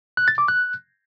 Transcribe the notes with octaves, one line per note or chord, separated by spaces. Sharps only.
F#6
A6
D6
F#6